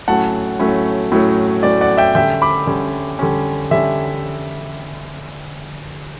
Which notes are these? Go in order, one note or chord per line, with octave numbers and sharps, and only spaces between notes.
A2 F#3 A3 C#4 F#5 A5
A2 F#3 A3 C#4
A2 F#3 A3 C#4
A2 F#3 A3 C#4 D5
D5 F#5
E5 G5
D3 G3 C#4 E5 G5
B5 D6
D3 G3 C#4
D3 G3 C#4
D3 G3 C#4 E5